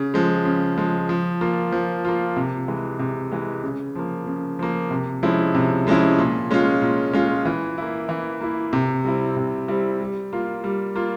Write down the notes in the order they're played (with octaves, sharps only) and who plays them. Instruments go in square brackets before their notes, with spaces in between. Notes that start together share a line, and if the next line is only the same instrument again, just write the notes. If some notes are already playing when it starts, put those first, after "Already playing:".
Already playing: [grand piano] C#3
F3 G#3
C#3
F3 G#3
F3
A#3 F4
F3
A#3 F4
C3
E3 G#3
C3
E3 G#3
C#3
F3 A#3
C#3
F3 A#3
C3
F3 G#3 C#4 E4
C3
F3 G#3 C#4 E4
A#2
G#3 C#4 F4
A#2
G#3 C#4 F4
E3
A#3 E4
E3
A#3 E4
C3
G3 C4 E4
C3
G3 C4 E4
G3
A#3 F4
G3
A#3 F4